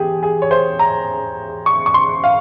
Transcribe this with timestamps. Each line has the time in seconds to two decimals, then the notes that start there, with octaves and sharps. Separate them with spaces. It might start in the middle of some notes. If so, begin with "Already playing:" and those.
Already playing: E2 G4 G#4
0.23 G#4
0.42 C#5
0.51 C5
0.79 A#5
1.66 C#6
1.86 C#6
1.94 C6
2.24 F5